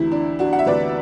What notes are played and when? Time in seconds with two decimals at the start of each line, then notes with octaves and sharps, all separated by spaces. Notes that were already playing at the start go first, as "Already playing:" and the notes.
Already playing: D2 C3 E3 E4
0.12 D4
0.39 D4 F#4
0.53 F#5
0.59 E5
0.66 D2 C3 E3 B4 D5